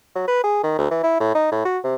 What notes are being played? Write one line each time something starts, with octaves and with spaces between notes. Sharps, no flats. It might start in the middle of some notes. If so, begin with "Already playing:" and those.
F#3
B4
G#4
D#3
D2
E3
E4
A2
D#4
A2
F#4
C3